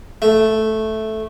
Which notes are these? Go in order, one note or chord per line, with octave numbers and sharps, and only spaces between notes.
A3